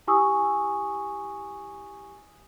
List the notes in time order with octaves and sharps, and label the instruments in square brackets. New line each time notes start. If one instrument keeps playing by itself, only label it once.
[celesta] E4 G4 G#5 C#6 D#6 E6